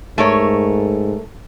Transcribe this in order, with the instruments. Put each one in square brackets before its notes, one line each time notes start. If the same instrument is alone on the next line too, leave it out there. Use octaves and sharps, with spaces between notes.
[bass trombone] G#2 [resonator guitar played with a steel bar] A3 A#4 C#5